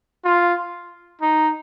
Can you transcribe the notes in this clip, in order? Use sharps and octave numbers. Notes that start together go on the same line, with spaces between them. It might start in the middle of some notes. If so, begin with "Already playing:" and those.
F4
D#4